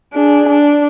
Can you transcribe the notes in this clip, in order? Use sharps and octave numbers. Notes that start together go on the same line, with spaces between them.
D4 G#4
D4